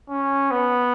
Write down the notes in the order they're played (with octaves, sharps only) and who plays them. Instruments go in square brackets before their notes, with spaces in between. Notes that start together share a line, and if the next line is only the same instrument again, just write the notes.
[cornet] C#4
B3